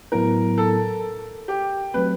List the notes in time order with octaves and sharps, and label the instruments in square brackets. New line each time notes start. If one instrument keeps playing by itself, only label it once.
[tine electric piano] A2 F#3 B3 E4 [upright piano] A#4
[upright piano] A4
G4
[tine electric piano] F#3 A3 C4 [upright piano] B4